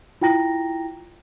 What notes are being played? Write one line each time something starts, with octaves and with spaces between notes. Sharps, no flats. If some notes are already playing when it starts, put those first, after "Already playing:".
E4 F4 G5 A#5 A#6